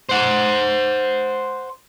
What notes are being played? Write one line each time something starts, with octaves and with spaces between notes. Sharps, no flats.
C5 F#5